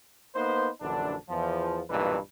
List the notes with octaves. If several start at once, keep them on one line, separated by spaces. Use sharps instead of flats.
A#3 B3 D#4 B4 C5
A#1 F#2 D3 E3 D4
E2 F3
B1 G2 A#2 E3 D#4 B4